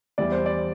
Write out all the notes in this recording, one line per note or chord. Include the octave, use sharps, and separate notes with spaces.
E2 E3 G3 D5
C5
D5